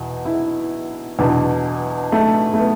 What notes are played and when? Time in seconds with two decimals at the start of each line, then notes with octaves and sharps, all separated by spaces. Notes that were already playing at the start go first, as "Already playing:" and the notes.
Already playing: E2 B2
0.25 E4
1.19 E2 B2 D4
2.12 A3
2.54 A3
2.59 B3